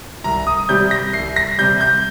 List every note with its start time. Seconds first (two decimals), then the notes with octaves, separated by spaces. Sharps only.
0.24 C2 A#5
0.47 D#6
0.69 C3 G3 G6
0.91 A#6
1.13 C2 C7
1.36 A#6
1.58 C3 G3 G6
1.81 G6